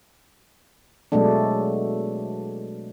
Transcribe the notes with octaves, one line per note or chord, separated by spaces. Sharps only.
B2 F#3 G#3 A3 D4